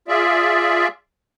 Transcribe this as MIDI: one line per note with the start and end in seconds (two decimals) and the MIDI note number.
0.08 0.88 65
0.08 0.88 68
0.08 0.88 74
0.08 0.88 76